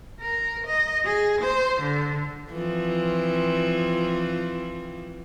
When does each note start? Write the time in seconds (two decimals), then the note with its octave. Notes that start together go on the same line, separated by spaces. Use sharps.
0.21 A#4
0.67 D#5
1.06 G#4
1.42 C5
1.81 D3
2.51 E3 F3 C4